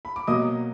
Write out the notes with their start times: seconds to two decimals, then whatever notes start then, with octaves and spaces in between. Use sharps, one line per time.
0.05 B5
0.16 D6
0.27 B2 F#3 A#3 D#5 D#6